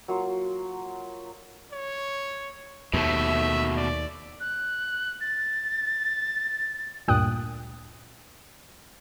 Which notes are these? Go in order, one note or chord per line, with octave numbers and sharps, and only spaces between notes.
F#3 A#3 F4
C#5
D#2 B2 A3 E5
D5
F#6
A6
D2 G2 A#2 G5 D#6 F#6